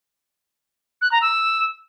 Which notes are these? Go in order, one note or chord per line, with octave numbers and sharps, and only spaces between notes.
F#6
A#5
E6